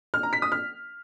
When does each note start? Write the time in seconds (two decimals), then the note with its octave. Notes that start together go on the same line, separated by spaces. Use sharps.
0.14 F6
0.23 A#5
0.33 B6
0.42 D#6
0.52 F6